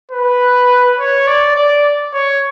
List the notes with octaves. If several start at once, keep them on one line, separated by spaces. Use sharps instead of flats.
B4
C#5
D5
D5
C#5